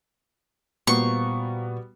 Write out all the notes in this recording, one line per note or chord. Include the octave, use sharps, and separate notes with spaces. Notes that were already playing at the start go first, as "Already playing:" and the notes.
A#2 G3 A#3 B3 F#4 C5 C#6